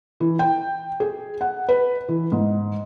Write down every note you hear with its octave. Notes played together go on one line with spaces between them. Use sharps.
E3
G5
G#4
F#5
B4
E3
G#2